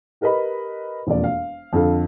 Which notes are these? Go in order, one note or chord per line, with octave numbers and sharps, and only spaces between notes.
G4 A#4 B4 D#5 B5
E1 F2 A#3 D5
F5
F2 D3 A4 F5